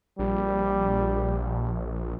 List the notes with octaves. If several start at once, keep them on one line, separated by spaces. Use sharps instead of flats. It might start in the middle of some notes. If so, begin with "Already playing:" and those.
A#1 G3